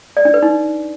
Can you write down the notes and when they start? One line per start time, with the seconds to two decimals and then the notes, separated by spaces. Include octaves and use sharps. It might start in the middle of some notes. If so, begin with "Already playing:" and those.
0.17 D5
0.25 D4
0.34 B4
0.43 D#4